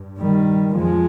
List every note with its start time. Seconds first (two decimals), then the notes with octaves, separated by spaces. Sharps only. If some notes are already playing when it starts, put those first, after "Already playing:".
Already playing: G2
0.18 D#3 G3
0.76 F2 F3 G#3